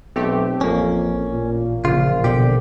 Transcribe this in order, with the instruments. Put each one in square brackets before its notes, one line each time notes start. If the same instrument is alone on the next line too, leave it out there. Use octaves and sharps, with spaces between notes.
[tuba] B1 [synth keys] A3 C4 G4
[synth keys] A1 A#3 [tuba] F2 [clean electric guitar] C#4
[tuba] A#2
[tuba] A#1 [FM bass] C#3 [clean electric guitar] F4
[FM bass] B2 [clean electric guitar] D3 G4